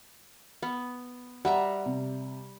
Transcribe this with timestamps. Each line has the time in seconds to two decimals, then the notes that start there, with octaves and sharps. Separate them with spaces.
0.62 B3
1.45 G3 E5 F#5 A#5
1.86 C3